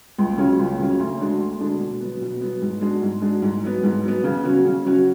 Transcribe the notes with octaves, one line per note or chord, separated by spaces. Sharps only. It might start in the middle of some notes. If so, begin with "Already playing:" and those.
C#2
C#3 F#3 C#4
C#2
C#3 F#3 C#4
D2
D3 G#3 D4 F#4
D2
D3 G#3 D4 F#4
B2
F#3 B3
B2
F#3 B3
G#2
G#3 D4 F#4
G#2
G#3 D4 F#4
G#2
F#3 B3
G#2
F#3 B3
C#3
F#3 C#4 F#4
C#3
F#3 C#4 F#4